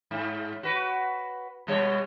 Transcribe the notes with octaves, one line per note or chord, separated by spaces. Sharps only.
G#2
F#4 B4
B2 G3 C#5